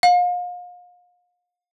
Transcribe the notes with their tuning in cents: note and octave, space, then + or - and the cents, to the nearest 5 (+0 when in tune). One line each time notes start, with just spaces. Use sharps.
F5 +35